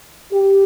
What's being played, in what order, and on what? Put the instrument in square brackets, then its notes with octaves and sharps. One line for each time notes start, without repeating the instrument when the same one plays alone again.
[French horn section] G4